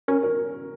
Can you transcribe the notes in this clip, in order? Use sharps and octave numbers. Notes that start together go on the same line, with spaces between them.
C#4 A#4
A#4